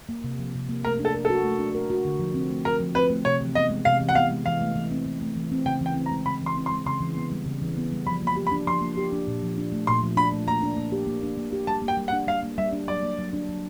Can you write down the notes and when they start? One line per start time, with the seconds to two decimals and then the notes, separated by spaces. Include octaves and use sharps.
0.09 A#3
0.24 C3
0.39 F3
0.54 C3
0.69 A#3
0.85 A3 A#4
0.99 D4
1.05 A4
1.14 A#4
1.25 A4
1.30 F#4
1.45 A3
1.59 D4
1.75 A#4
1.90 F#4
2.05 D3
2.19 F3
2.34 C4
2.51 A3
2.65 D3 A#4
2.80 F3
2.95 C4 B4
3.10 A3
3.25 C3 C#5
3.41 E3
3.55 B3 D#5
3.70 G#3
3.85 C3 F5
4.01 E3
4.09 F#5
4.15 B3 F5
4.31 G#3
4.46 E3 F5
4.61 A3
4.76 E3
4.91 C4
5.06 E3
5.21 A3
5.36 E3
5.52 C4
5.66 C#3 G5
5.81 E3 G5
5.96 C4
6.06 A#5
6.12 G#3
6.26 C#3 B5
6.42 E3 C6
6.57 C4
6.66 C6
6.72 G#3
6.86 C#3 C6
7.01 E3
7.17 B3
7.32 G3
7.46 C#3
7.62 E3
7.77 B3
7.92 G3
8.07 F3 B5
8.22 A#3 B5
8.36 G4
8.47 B5
8.52 D4
8.67 F3 C6
8.81 A#3
8.97 G4
9.13 D4
9.27 A#2
9.43 F3
9.58 D4
9.72 A3
9.87 A#2 C6
10.03 F3
10.17 D4 B5
10.32 A3
10.47 A#3 A#5
10.63 D4
10.77 A#3
10.92 G4
11.07 A#3
11.23 D4
11.37 A#3
11.53 G4
11.67 G3 A5
11.82 A#3
11.88 G5
11.97 G3
12.08 F#5
12.13 D4
12.27 G3 F5
12.43 A#3
12.58 G3 E5
12.73 D4
12.88 F#3 D5
13.03 A#3
13.18 F#3
13.33 D4
13.49 F#3